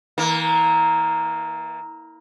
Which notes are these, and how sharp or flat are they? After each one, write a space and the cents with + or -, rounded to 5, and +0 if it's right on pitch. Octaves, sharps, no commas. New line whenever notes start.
E3 -35 A#3 +0